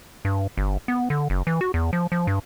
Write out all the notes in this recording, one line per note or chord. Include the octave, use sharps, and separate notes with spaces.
G2
G1
B3
D3
F#1
E3
F#4
E2
F3
F3
G2